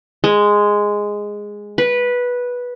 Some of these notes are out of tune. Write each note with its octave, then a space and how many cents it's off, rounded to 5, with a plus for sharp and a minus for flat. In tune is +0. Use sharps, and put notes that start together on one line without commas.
G#3 -5
B4 -10